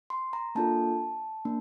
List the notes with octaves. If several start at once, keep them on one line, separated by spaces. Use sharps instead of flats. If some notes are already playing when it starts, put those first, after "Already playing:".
C6
A#5
A#3 D4 F4 A4 A5
A#3 D4